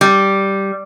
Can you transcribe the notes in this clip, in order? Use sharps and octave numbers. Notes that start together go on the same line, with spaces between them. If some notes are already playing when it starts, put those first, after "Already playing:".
G3